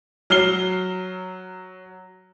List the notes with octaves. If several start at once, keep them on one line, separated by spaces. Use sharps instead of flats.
F#3 F6 C7 G7